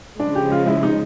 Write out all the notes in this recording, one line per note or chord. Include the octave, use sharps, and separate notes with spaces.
C#3 F3 G#3 D4
G4
F4
E4
D#4